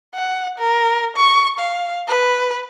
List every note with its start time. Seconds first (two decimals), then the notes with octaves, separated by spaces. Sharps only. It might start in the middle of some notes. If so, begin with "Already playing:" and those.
0.15 F#5
0.58 A#4
1.16 C#6
1.59 F5
2.08 B4